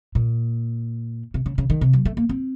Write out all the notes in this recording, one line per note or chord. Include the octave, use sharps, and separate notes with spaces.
A#2
C3
C#3
C#3
D#3
C3
F#3
A3
A#3
C4